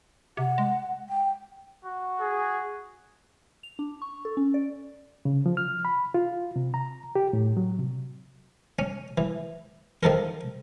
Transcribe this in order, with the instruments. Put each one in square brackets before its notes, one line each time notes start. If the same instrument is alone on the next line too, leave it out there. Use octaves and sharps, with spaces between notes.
[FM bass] C3 [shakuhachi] F#5
[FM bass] G#3
[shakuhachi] G5
[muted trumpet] F#4
[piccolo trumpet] G#4
[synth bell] F7
D4
C#6
A4
C#4
D5
[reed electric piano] C#3
F3
F6
B5
F4
C3
A#5
G4
A2
F#3
C3
[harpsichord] C#4
E3
D#3 F3 A4 A#4